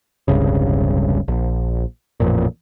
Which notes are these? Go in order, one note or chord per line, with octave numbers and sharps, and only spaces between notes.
E1 C2 G2 C#3
A#1
A1 F2 A#2